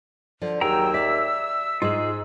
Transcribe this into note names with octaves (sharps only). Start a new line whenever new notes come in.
D3 F3
D#2 F#3 G#4 G5 A#5 E6
D5 E5
G#2 G#3 D#4 F4 G#4